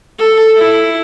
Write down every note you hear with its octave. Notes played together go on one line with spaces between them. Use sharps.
A4
E4